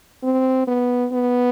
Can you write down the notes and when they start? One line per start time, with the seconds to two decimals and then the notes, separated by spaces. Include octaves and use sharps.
0.24 C4
0.67 B3
1.13 B3